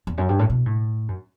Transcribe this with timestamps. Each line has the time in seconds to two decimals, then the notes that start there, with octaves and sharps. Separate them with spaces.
0.07 E2
0.18 F#2
0.29 G2
0.39 A2
0.50 B2
0.66 A2
1.08 F#2